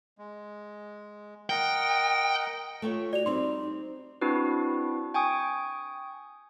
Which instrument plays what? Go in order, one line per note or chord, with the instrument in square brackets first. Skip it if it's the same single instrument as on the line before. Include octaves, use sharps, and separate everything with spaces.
[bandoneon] G#3
[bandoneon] A#4 D#5 F#5 [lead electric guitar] G5
[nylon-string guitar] A3 F4 C#5
[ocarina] F#4 [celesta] D5 F7
[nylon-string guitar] G3 C4 [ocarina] D#4 [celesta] C6
[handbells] C4 D4 E4 F#4 B4
G5 G#5 C#6 D#6